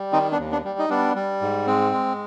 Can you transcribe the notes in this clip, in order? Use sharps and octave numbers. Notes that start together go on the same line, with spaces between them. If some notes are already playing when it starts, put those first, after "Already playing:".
Already playing: G3
D#3 C4 D#4
B3 D4
D#2
B3 D4
G3
D#4
G3 B3 D4
G3
G#2
G#3 C4
G#3